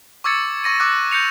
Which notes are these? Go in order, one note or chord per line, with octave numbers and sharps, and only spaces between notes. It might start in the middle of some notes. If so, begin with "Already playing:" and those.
C#6 D6 E6 G#6 A6 C#7
C#6 A#6 D#7
D6 E6 F#6
G6 A#6 C#7 F7